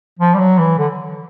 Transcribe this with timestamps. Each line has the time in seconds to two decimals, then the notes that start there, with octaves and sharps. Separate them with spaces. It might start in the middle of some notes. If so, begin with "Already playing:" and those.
0.19 F3
0.34 G3
0.39 F#3
0.58 E3
0.78 D3